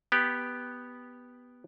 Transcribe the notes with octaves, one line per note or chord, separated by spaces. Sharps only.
B3 G4